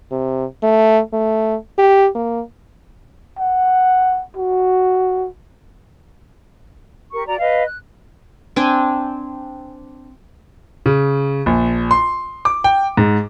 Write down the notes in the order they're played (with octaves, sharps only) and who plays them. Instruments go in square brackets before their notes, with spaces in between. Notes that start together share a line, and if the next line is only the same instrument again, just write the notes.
[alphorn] C3
A3
A3
G4
A#3
[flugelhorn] F#5
F#4
[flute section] G4 A#4 C#6
F#4 D5 A#5
B4 D#5 F5
F#6
[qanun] C4 D4 G5 G#5
[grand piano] C#3
A#1
C6
D6
G5
G#2